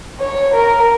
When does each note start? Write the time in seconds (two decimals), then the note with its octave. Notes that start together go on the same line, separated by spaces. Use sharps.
0.20 C#5
0.54 A#4